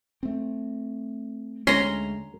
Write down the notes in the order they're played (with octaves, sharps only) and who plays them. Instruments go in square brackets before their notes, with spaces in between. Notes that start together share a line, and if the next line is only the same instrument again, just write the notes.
[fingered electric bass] A3 C4
[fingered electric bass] D2 G#3 [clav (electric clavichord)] C#4 [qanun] A#5 C6